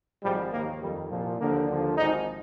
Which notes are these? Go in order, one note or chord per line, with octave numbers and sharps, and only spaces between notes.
G#1 G#2 F3 G3
D#2 D#3 A#3
F2 D#3 G3
C2 A#2 F3
D#2 D3 F3 A#3
D#2 D3 F3
G#1 G#2 F3 D#4